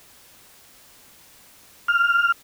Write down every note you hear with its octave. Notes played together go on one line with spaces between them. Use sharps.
F6